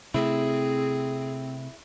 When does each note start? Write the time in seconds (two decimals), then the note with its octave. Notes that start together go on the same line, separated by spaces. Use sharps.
0.14 C3 A3 C4 E4 G#4